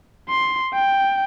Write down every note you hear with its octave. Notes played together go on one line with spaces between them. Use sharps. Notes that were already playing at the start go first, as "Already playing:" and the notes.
C6
G5